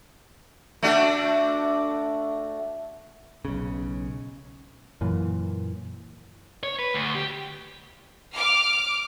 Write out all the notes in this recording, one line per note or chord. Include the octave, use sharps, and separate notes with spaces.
A3 D4 F#4
B1 C#3
F#2 A#2 E3
C#5
B4
D2
G4
D6 F6